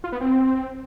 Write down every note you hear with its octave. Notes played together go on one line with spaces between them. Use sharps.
F4
B3
C4